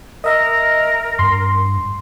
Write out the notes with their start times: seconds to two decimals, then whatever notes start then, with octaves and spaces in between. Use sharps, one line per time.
0.24 A#4 D#5 E5
1.19 G2 C6